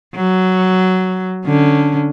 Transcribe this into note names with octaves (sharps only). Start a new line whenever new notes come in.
F#3
D3 C#4